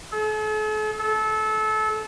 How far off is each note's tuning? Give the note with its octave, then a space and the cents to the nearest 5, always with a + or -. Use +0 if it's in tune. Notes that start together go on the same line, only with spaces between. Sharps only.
A4 -45
A4 -25